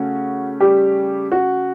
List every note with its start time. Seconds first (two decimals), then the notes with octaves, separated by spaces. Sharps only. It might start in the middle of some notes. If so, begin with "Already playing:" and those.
Already playing: C#3 A3 C#4 F#4
0.60 G3 G4
1.32 F#4